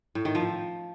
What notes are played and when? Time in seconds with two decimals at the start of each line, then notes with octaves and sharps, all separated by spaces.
0.15 A2
0.25 D#3
0.35 F3